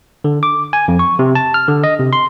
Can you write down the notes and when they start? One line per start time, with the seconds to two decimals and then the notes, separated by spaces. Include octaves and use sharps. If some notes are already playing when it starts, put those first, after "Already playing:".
0.24 D3
0.43 D6
0.73 G#5
0.88 F2
0.99 C#6
1.19 C3
1.35 A5
1.54 F6
1.68 D3
1.84 D#5
1.99 C3
2.13 C6